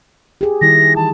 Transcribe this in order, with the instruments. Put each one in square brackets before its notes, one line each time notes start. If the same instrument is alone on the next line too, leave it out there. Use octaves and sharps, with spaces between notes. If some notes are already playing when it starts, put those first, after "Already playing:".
[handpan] G4 G#4
[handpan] D#3 G3 E4 [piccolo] A#6
[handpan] E3 [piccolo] A5